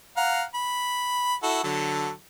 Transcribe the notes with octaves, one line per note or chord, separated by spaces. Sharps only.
F5 F#5 A#5
B5
E4 F#4 A4
D3 F#3 A4